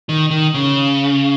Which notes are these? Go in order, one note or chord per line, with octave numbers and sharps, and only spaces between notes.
D#3
D#3
C#3